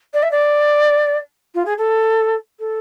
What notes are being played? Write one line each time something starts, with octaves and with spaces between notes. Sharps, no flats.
D5
E5
D5
F4
G#4
A4
A4